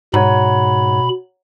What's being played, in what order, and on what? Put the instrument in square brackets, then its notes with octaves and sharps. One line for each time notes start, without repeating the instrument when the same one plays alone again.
[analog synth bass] G#2 [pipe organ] B2 B5 [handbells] C#5 F#5 A#5